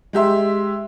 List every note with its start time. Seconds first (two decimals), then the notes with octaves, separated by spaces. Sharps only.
0.13 G#3 G4 E5 C6